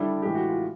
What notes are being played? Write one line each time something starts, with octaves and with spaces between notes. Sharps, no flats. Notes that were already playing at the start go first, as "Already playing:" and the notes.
Already playing: D3 G3 D4 E4
A2 E3 G#3 G4
F#4
F4